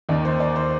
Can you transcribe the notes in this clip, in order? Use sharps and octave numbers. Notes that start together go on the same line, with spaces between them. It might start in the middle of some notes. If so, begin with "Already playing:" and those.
D#2 D#3 D5
C5
D5
C5